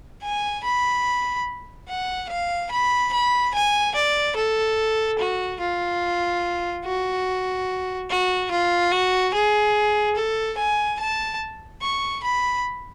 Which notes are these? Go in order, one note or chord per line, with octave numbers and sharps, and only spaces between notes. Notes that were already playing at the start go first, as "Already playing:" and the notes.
G#5
B5
F#5
F5
B5
B5
G#5
D5
A4
F#4
F4
F#4
F#4
F4
F#4
G#4
A4
G#5
A5
C#6
B5